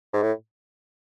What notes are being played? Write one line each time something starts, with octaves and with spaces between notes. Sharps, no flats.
G#2
A2